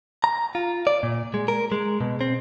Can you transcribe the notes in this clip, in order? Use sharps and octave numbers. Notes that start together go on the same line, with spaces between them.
A#5
F4
D5
A#2
G#3
A#4
G#3
B2
C4